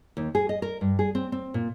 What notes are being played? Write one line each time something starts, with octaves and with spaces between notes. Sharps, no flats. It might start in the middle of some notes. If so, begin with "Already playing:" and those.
D#2
G#4
D#5
A#4
G2
G#4
C4
C4
A#2